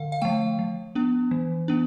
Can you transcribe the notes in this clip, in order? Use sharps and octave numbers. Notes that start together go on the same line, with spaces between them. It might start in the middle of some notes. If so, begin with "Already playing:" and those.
Already playing: D3 F5
F5
F3 A3 G5
F3
B3 D4
E3
B3 D4